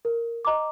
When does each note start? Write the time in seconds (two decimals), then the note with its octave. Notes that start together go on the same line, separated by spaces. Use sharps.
0.05 A#4
0.45 D#5 A#5 D6